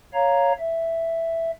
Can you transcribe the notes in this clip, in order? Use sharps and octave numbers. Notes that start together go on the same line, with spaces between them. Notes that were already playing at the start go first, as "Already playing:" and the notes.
C#5 F5 A#5
E5